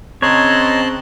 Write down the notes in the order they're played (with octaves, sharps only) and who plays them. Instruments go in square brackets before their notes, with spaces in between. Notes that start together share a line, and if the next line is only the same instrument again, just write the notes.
[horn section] C#3 C4 [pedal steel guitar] C#5 [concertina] D#5 A#5 [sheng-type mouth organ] A5 C6 F#6